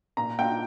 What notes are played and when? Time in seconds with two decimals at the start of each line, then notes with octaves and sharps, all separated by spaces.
0.17 A#2 A#5
0.38 A#3 D4 F4 G5